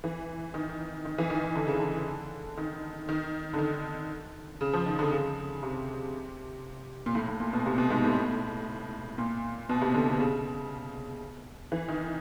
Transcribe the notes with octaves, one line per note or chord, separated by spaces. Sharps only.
E3
D#3
D#3
E3
D#3
D#3
D3
C#3
D3
D#3
D#3
D3
D#3
C#3
F3
D#3
D3
C#3
C3
A#2
A2
A2
A#2
B2
C3
B2
G#2
A2
A#2
B2
C3
D3
D3
C#3
E3
D#3